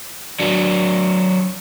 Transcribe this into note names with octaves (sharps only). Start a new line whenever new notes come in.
F#3 D4